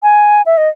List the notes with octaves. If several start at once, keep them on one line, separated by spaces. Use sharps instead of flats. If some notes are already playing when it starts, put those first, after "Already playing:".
G#5
E5
D#5